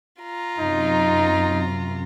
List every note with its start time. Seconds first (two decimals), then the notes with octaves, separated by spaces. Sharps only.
0.21 F4 A#5
0.60 F#2 C3 D#4